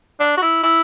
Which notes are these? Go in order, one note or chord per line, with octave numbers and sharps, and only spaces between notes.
D4
F#4
E4
E4